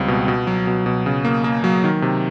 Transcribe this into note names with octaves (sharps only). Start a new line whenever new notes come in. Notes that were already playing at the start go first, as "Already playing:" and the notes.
Already playing: C#2 G3 C4
B2
B2
F#3
B2
B2
C#3
A#3
A#3
F#3
D#3
C3